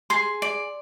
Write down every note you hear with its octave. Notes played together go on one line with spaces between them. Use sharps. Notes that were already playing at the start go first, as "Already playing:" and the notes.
G#4 C6
D5